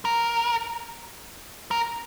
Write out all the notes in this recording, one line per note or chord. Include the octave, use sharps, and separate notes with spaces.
A#4
A#4